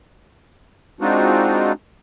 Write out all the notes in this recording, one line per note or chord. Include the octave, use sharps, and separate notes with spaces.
G#3 C4 D4 D#4 F4 F#4